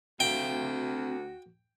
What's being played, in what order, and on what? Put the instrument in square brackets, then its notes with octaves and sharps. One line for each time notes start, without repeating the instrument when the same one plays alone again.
[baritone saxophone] D2 [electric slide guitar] C4 E5 F5 [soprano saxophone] F#4 [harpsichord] G5